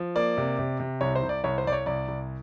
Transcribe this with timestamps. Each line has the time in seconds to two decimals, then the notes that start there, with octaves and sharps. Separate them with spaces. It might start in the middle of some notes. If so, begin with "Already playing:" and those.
Already playing: F3
0.16 A#3 D5
0.37 C3
0.59 C3
0.80 C3
1.01 C2 C#5
1.15 C5
1.23 C2
1.29 D5
1.44 C2 C#5
1.58 C5
1.65 C2 D5
1.73 C#5
1.86 C2 D5
2.08 C2